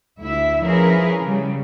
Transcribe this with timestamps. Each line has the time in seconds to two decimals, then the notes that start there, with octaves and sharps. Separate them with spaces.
0.20 D2 E4 E5
0.62 F3 C#4 E4 G#4 A#4 B4
1.22 C#3 G3